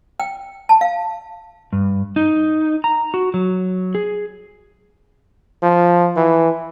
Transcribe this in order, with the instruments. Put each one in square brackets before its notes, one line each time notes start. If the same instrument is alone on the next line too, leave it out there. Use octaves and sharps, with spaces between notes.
[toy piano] G5
A5
F5
[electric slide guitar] G2
D#4
A#5
F#4
F#3
G#4
[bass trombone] F3
E3